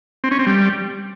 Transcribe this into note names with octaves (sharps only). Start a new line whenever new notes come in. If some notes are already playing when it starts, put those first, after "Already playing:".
C4
C#4
C4
G3